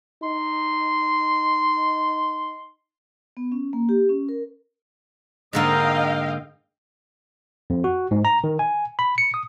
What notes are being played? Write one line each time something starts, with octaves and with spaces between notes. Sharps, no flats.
D#4 C6
B3
C#4
A#3
G4
C#4
A#4
G#2 D3 A#3 D#5 F5 G5
F2
F#4
G#2
A#5
D#3
G#5
B5
C#7
D#6